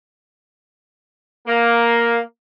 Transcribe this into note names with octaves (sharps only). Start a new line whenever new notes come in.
A#3